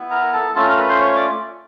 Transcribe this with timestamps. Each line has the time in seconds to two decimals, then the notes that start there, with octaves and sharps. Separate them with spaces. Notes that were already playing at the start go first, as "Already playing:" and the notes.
Already playing: B3 E4
0.11 A#4 A#5
0.33 A4 A5
0.55 A3 C#4 F4 A4 A5
0.67 A#4 A#5
0.77 B4 B5
0.88 C5 C6
1.00 C#5 C#6
1.15 D5 D6